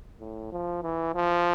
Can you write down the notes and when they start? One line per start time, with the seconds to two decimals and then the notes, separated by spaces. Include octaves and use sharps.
0.20 A2
0.52 F3
0.82 E3
1.14 F3